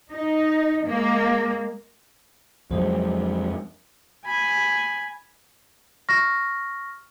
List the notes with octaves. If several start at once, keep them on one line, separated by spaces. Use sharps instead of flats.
D#4
G#3 A#3
F2 F3 F#3 G#3 C5
G#5 B5
C#6 F6 A#6